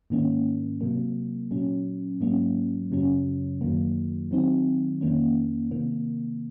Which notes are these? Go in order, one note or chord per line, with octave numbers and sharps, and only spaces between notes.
G#2 D#3 A#3 C#4
C3 F#3 A#3
A#2 F#3 C#4
G#2 F#3 A#3 C#4
F#2 C#3 F#3 C#4
F#2 D#3 F#3 A#3
D#3 F#3 C4 D#4
F2 D#3 A#3 C#4
C3 D#3 A#3